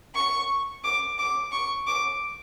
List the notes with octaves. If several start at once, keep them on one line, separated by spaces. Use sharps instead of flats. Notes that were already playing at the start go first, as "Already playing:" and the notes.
C#6
D6
D6
C#6
D6